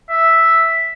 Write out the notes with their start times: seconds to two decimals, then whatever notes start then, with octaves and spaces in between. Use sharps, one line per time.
0.09 E5